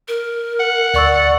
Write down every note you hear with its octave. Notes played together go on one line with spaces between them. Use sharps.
A#4
F#5
D2 D5 C#6 E6